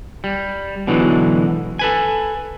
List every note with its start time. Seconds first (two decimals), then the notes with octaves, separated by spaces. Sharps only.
0.24 G3
0.87 B2 D3 E3 F#3 G#3
1.79 A4 B4 G#5